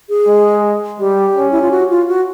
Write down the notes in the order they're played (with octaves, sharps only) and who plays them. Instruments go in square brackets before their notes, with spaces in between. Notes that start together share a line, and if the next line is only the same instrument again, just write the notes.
[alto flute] G#4
[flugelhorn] G#3
[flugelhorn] G3 [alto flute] G4
[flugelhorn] C#4
[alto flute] E4
F4
F#4
F4
F#4